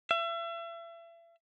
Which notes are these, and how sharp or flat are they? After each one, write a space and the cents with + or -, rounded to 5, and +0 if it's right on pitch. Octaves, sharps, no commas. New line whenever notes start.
E5 +35